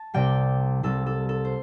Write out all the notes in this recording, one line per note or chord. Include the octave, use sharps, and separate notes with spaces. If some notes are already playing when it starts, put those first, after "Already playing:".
Already playing: A5
C2 C3 G3 D5 G5
C2 C3 G3 A4
A4
A4
C5